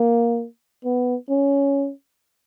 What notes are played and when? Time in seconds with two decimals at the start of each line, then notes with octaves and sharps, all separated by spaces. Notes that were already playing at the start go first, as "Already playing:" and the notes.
Already playing: A#3
0.84 B3
1.29 C#4